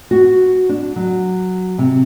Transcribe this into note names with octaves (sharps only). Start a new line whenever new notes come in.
F#4
D4
F#3
C3